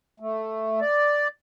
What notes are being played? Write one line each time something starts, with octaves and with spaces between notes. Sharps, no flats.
A3
D5